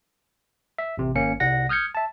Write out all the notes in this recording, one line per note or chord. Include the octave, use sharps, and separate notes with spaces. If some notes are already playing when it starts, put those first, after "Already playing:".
E5
A1 C3
G#1 A#3 C#4 C#7
C2 G3 F#5 A#6
D#6 F6 G6 G#6 C#7
E5 A5